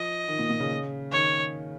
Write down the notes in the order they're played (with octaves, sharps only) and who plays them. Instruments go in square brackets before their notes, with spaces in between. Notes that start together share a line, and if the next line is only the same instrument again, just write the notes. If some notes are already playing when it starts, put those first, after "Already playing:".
Already playing: [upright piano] F3 [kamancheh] D#5
[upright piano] D#3
A#2
A#2
C#3
[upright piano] D#3 [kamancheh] C#5